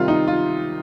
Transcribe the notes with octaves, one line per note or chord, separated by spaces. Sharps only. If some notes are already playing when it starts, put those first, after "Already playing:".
Already playing: C3 D#3 G3 F4
D#4
F4